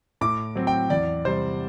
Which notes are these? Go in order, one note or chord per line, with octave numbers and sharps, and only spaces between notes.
A2 D6
F#3 C4
G5
E2 D5
C3 G3 C5